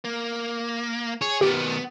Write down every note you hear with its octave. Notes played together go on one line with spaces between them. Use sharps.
A#3
G#4 C#5
B2 D#3 B3 G4